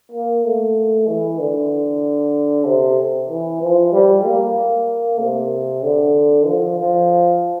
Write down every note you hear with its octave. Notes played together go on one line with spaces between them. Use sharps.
A#3
A3
E3
D3
C3
E3
F3
G3
A#3
C3
D3
F3
F3